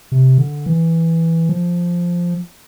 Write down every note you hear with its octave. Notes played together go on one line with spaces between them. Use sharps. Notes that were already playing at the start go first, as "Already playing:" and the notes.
C3
D3
E3
F3